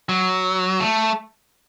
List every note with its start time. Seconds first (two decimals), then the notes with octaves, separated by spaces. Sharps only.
0.09 F#3
0.80 A3